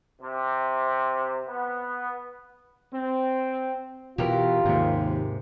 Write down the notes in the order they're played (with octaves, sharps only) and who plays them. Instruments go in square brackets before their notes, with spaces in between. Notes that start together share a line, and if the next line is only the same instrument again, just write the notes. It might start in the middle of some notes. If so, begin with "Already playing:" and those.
[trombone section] C3
B3
C4
[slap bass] B2 E3 [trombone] F4 [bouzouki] G4 A#4
[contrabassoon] D#2 [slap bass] G#2 C3